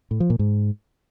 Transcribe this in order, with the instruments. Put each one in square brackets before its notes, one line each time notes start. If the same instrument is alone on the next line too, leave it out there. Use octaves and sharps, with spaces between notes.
[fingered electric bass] A2
F3
A#2
G#2